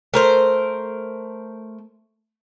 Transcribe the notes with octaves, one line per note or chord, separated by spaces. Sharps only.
A3 A#4 C5